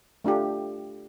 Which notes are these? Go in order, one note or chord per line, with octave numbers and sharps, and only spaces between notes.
A3 D4 F4 G4